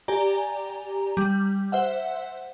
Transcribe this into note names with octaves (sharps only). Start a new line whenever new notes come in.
G4 D5 G#5 A#5
G3
C5 E5 F#5